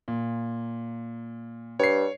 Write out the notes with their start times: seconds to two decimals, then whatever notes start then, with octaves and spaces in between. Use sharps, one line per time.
0.08 A#2
1.80 G2 C#5 C7